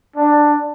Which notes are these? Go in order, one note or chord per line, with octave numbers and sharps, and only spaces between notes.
D4